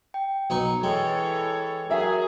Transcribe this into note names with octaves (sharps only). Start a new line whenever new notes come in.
G5
B1 D#4 C#6
E3 G#3 A4 C#5 G5
F#3 G#4 A#4 E5 G#5